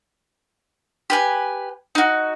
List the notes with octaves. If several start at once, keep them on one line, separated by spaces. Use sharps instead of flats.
G4 B4 G#5
D#4 F#4